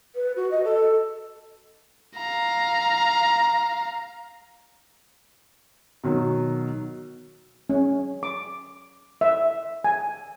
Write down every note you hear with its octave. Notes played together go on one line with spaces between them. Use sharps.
B4
F#4
D#5
A4
F5 A#5
B2 D#3 F#3
C#4
D6
E5
G#5